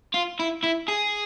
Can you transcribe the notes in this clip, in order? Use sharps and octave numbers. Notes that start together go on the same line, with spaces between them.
F4
E4
E4
G#4